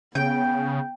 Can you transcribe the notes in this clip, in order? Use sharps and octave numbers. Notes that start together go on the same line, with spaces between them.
C#3 B3 G5